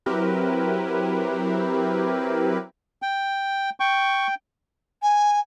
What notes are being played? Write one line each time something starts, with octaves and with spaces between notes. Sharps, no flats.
F#3 C4 E4 G4 A#4 B4
G5
G5 C#6
G#5